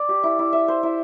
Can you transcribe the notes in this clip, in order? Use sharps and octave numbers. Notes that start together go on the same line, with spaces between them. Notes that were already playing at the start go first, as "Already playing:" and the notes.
Already playing: D5
G4
E4
E4
E5
C5
E4